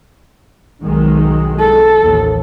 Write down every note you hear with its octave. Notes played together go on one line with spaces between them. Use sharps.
B1 D#3 G#3
A4
A1 D#2